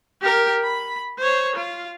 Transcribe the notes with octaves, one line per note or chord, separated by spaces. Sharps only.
G4 A#4
B5
C5 C#5
F4